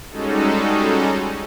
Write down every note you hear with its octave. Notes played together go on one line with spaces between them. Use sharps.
G3 G#3 C#4 D#4 F#4 A4